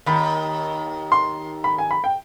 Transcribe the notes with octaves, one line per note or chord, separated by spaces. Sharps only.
D#2 D#3 B5
C6
B5
G#5
B5
G5